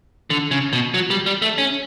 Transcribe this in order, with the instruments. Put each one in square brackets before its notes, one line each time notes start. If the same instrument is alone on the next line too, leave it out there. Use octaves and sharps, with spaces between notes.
[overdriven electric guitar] D3
C#3
B2
F#3
G3
G3
A3
C#4